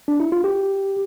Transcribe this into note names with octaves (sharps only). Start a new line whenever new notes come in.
D4
E4
F4
G4